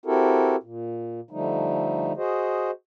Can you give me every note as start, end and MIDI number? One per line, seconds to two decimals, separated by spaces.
0.06 0.56 60
0.06 0.56 64
0.06 0.56 66
0.06 0.56 67
0.06 0.56 69
0.06 0.56 70
0.63 1.20 46
1.31 2.13 50
1.31 2.13 53
1.31 2.13 55
1.31 2.13 57
1.31 2.13 63
2.17 2.71 66
2.17 2.71 68
2.17 2.71 72
2.17 2.71 75